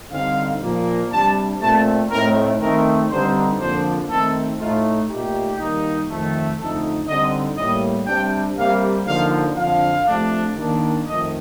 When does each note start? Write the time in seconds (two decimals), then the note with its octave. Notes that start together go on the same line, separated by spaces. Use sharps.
0.12 D3 G3 C4 D#4 F5
0.62 A#2 F3 A#3
1.11 C3 G3 D4 A5
1.61 A#2 A3 C4 A5
2.11 A2 A3 C4 D#4 A#4
2.61 D#3 A3 C4 D#4 A#4
3.10 G2 D3 G3 C4 D#4 C5
3.60 F2 D3 F3 A#3 D4 C5
4.09 D#3 A3 C4 D#4 A4
4.59 A2 A3 D#4 F4
5.09 A#2 A3 D#4 G4
5.58 D#3 G3 A#3 D#4
6.08 F2 D#3 A3
6.59 F2 D3 A3 D#4 A4
7.08 D3 G3 C4 D#4 D#5
7.57 A2 G3 A#3 D#5
8.07 C3 G3 D4 G5
8.57 C3 G3 A#3 F5
9.06 D3 F3 A#3 D#4 F5
9.56 F2 D3 F3 F5
10.06 C3 F3 A3 D4
10.56 D#3 A#3 D4
11.06 F2 D#3 A3 D#5